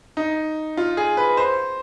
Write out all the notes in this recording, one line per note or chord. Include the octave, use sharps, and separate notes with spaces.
D#4
F4
G#4
B4
C5